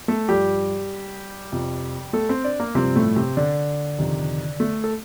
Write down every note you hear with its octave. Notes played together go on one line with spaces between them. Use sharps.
A3 A4
G2 F3 G3 G4
F2 C3 F3
A3 A4
C4 C5
D4 D5
A#3 A#4
G2 C3 F3 C4
A2 A3
C3 C4
D3 D4
F2 C3 D#3
A3 A4
A4